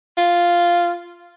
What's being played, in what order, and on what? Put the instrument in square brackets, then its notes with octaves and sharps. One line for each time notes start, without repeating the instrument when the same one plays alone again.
[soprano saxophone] F4